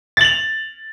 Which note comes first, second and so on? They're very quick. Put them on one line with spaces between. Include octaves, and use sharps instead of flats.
A6 F#7 F7